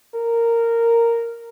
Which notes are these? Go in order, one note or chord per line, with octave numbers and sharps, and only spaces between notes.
A#4